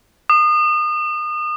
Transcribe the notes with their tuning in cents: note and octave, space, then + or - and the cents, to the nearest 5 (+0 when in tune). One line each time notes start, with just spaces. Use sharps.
D#6 -35